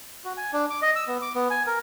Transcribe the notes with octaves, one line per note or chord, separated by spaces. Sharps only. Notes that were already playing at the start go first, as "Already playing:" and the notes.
F#4
G#5
D4
D6
D#5
E6
B3
D6
B3
G#5
A#4